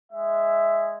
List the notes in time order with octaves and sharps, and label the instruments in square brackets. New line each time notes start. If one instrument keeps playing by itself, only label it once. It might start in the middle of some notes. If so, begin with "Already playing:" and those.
[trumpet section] G#3 E5